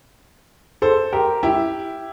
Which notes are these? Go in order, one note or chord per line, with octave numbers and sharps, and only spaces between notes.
A4 C5
G4 A#4
E4 G4